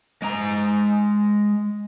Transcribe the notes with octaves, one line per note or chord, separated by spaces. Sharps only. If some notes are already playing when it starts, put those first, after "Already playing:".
G#3 A#5